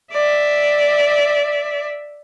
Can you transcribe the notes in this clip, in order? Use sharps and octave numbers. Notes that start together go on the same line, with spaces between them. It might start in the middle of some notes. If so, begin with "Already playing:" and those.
D5 E5